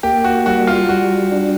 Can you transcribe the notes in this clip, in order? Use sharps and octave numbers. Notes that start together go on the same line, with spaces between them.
A#3 G4
F#4
G3 F#4
F4
G3 F#4
D4